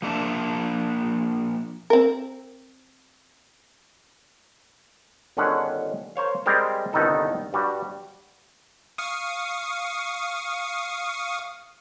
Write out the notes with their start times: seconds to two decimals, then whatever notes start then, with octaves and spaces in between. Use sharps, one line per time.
0.02 F3 A#3 D4 E5 A5
1.90 C4 A#4
5.37 G1 D3 D#3 C#4 G#4 F#5
6.16 A#4 C5 C#5 F5
6.46 G3 G#3 C4 G#4 A#4 C5
6.93 G1 C2 D#3 B3 D#4 A4
7.53 G2 G3 F#4
8.98 F5 C#6 D#6